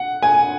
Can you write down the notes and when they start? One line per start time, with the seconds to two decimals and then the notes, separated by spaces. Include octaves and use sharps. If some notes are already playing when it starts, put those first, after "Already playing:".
Already playing: F#5
0.23 G#5